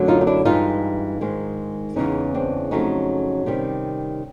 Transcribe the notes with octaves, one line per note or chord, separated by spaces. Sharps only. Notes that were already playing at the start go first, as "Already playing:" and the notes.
Already playing: F#2 D3 F#3 A3
D#4 F4
D#4
D4 E4
G2 E3 G#3 D#4 F4
G#2 D#3 G#3
E2 C#3 E3 G#3 C#4 D#4
C4 D4
F2 C#3 F#3 A3 C#4 D#4
C3 D#3 G3